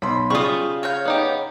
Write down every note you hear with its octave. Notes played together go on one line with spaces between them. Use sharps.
B1 B5 C6
C#3 G3 F4 C#6 D#6
C#5 F5 G6
B3 D#4 G4